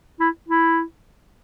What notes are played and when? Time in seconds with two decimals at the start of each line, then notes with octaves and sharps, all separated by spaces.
0.20 E4
0.48 E4